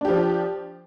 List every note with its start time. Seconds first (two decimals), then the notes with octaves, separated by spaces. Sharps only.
0.01 D4
0.05 G4
0.08 F3